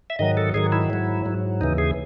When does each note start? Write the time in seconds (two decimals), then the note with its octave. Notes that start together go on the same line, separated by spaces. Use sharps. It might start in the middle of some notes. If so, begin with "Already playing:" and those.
0.10 E5
0.19 G#2 D#3 F#3 D#5
0.37 A4
0.54 G#2 D#3 F#3 G#4
0.72 E4
0.90 G#2 F#3
1.25 G#2 F#3
1.61 D#2 C#3 E3 D#4
1.78 G#4